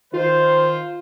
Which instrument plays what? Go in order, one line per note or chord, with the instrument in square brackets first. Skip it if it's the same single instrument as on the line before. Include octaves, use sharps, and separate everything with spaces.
[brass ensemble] D#3 C5 [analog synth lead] F4